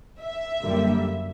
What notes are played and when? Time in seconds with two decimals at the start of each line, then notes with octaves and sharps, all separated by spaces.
0.20 E5
0.61 F#2 D3 G3 A#3